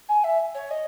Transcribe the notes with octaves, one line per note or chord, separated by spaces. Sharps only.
G#5
E5
C#5
D#5